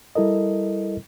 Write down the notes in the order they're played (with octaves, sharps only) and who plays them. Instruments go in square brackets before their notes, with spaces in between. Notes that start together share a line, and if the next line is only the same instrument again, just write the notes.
[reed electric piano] G3 E4 A4 A#4 D#5